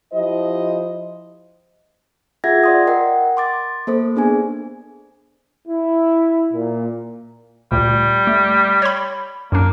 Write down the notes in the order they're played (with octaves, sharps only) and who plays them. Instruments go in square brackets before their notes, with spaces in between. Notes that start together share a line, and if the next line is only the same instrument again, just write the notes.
[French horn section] F3 E4 G4 C5 D#5
[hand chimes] F4 G#4 E5 F#5 G#6 A#6
D5 C6 D#6
A#4 D#5 F#5 G5
C6 D6 A6
A#3 A4 C5
B3 D4 G#4 G#5
[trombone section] E4
A#2
[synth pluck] D2 A#2 [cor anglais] G3
[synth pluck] A3
C#5 B5
[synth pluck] F#2 D4 [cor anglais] A#3